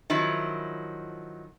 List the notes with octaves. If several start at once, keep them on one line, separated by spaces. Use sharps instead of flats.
D#3 F3 F#3 E4